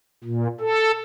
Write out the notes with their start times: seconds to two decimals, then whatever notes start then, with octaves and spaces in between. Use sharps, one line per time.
0.24 A#2
0.60 A4